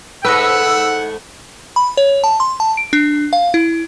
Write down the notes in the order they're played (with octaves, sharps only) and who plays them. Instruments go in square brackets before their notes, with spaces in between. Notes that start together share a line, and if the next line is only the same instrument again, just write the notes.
[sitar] G#2 A3 [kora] B4 D#5 [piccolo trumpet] F#5 [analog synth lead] E6
[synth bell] B5
C#5
A5
C6
A5
D7
D4
F5
E4